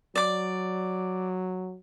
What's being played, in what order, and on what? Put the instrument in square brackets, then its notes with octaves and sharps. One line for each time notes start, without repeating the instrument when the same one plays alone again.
[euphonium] F#3 [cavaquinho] D5 D6